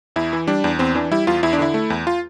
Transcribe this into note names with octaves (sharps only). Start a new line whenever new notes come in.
E2 E4
E3
G3 D4
E2
E2 C4
E3 D4
G3 E4
E2 F4
E2 E4
D4
D3 E4
A3
E2
F4